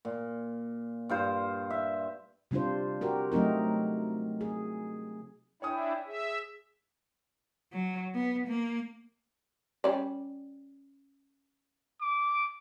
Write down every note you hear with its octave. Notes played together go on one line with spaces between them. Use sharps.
A#2
G2 F4 C5
E5
C3 G3 D4 F4 C5
F#4 G4 A#4
F#3 A3 C4 D#4 A#4
G#4
D4 E4 C#5 G5 G#5 D#6
G#4 E5
F#3
B3
A#3
G3 C#4 D5
D6